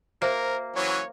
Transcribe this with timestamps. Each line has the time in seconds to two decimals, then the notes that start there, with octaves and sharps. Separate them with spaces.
0.22 A#3 F#4 A#4 C5 E5
0.76 E3 F#3 C#4 C#5